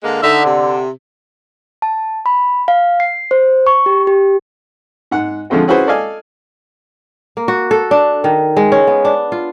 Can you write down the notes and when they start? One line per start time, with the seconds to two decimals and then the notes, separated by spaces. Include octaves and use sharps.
0.03 D3 G#3 A#3
0.23 D3 D#4 E5
0.44 C3
1.82 A5
2.26 B5
2.68 F5
3.00 C7
3.31 C5
3.67 C#6
3.86 G4
4.07 G4
5.11 G#2 F#5
5.50 D3 F3 G#3 A3 C4 F#4
5.68 C#4 E4 F#4 G#4 B4 C5
5.87 A4 D5 D#5 F5 G#5
7.37 A#3
7.48 F#4
7.71 A4
7.91 D4
8.24 D#3
8.57 G#3
8.72 C#4
8.87 B3
9.05 D4
9.32 F4